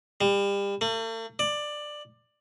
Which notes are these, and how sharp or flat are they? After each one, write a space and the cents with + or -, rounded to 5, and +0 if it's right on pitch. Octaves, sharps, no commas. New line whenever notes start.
G3 +30
A3 +45
D5 +15